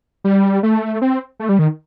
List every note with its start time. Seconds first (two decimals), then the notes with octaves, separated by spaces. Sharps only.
0.24 G3
0.63 A3
1.02 C4
1.40 A3
1.49 G3
1.59 D#3